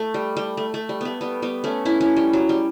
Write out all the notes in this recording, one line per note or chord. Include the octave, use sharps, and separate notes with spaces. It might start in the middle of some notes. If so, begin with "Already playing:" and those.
Already playing: A3
G3
G3
A3
A3
G3
A3 B3
G3 B3
G3 B3
A3 C#4
C#4 E4
C#4 E4
G3
F#3
G3